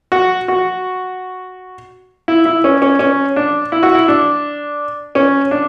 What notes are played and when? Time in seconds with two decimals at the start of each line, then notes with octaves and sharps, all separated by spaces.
0.12 F#4
0.48 F#4
2.28 E4
2.45 E4
2.64 C#4
2.82 C#4
2.99 C#4
3.36 D4
3.72 E4
3.83 F#4
3.95 E4
4.08 D4
5.15 C#4
5.51 D4